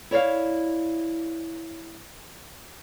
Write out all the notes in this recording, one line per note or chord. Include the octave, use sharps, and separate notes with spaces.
E4 C#5 D5 F5